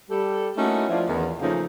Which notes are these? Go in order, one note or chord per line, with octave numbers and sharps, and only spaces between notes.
G3 G4 A4
A3 A#3 C#4 D#4 E4 F#4
F3 A3 D4 E4 F4
E2 D#3
C#3 F3 A3 A#3 C#4 D#4